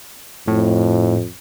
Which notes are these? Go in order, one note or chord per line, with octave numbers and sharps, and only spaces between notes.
F2 A2